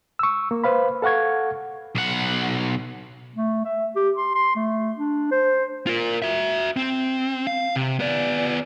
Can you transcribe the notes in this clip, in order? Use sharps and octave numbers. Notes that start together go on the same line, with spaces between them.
C#6 E6
A#3
B4 C5 F5 B5
A4 F5 F#5 C#6 G#6
B1 F#5
A3
E5
G4
C6
C6
A3
D4
C5
F4 A#4
F#4 E5
C4
F5
C3
B3 D5